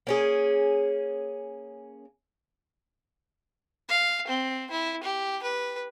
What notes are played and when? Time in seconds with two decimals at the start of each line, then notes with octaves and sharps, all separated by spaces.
0.07 A#3 C#4 G#4
3.89 F5
4.27 C4
4.71 E4
5.03 G4
5.43 B4